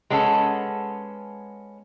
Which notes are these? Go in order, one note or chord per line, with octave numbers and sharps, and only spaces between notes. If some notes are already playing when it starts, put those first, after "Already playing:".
G#3 B3 C#4 A4